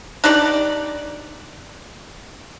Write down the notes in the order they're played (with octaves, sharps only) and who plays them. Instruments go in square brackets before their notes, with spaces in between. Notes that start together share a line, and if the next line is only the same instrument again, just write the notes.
[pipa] D4 D#4 G4 D5